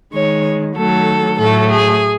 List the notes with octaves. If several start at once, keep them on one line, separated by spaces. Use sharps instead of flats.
D#3 G#3 C#5
D#3 F#3 A3 A4
A2 F#3 A3 A4
G#4